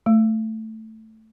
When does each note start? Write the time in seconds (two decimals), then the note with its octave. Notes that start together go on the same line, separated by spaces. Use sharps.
0.06 A3